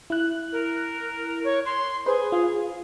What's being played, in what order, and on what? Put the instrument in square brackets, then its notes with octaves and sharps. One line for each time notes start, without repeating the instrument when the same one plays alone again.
[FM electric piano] E4 F#6
[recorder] A#4
C#5
C6
[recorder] G#4 [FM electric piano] B4 C5
[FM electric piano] F4